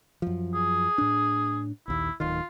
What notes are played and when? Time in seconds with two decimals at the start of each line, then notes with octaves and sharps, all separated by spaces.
0.22 F#2 F3
0.54 G#4
0.98 A2 D4
1.88 A#1 D#2 E4
2.20 D1 D#3 F4